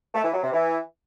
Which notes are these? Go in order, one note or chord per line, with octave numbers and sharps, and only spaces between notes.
A3
E3
F#3
C3
E3